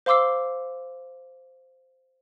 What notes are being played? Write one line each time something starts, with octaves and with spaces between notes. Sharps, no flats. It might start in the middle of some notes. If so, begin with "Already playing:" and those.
C5 F5 C6 D6 E6 C7